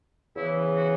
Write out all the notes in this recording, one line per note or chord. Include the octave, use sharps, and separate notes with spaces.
E2 C#3 E3 E4
F#4